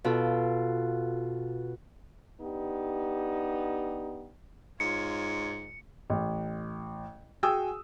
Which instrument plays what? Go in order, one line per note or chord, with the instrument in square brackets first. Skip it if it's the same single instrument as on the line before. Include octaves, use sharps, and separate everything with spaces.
[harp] B2 F4 A4
[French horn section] B3 D4 D#4 G4
[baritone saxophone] G#2 [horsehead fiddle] F4 C#5 [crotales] C#7
[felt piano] A1
F#4 G#4 G5 G#5 D#6 E6